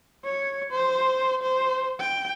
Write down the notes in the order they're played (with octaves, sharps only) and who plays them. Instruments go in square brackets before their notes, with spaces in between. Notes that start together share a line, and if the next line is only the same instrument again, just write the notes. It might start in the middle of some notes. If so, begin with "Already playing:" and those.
[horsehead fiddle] C#5
C5
C5
G5